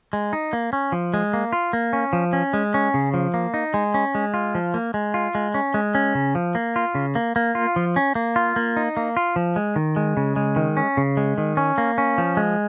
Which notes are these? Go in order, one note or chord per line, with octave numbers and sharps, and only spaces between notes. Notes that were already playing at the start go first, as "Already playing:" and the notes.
G#3
D#4
A#3
C#4
F3
G#3
A#3
F4
A#3
C#4
F3
C#4
G#3
C#4
C#3
F3
A#3
D#4
G#3
C#4
G#3
F4
F3
A#3
G#3
F4
G#3
C#4
G#3
C#4
C#3
F3
A#3
F4
C#3
A#3
A#3
F4
F3
C#4
A#3
F4
A#3
D#4
A#3
F4
F3
G#3
D#3
G#3
C#3
G#3
D#3
C#4
C#3
G#3
D#3
C#4
A#3
C#4
F3
G#3